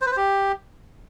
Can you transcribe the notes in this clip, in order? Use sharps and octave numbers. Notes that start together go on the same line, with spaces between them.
C5
B4
C5
G4